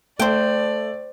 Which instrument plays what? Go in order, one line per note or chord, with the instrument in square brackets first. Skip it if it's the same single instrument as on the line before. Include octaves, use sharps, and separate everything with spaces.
[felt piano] A3 [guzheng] C5 G5 [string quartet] D5